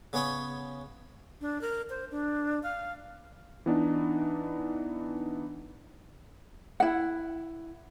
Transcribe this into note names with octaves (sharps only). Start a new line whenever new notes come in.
C#3 B3 C#4 C#5 B5 D#6
D4
A#4
C5
D4
F5
E3 B3 D4 D#4
E4 F#5